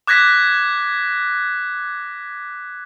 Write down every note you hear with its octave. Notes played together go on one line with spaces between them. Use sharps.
D6 F#6 G#6 A#6 B6